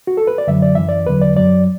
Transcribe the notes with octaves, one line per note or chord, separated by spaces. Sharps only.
F#4
A4
B4
D5
F#2 D3 F#3 E5
D5
F#2 E3 E5
D5
E2 D3 F#3 B4
D5
F#2 F#3 D5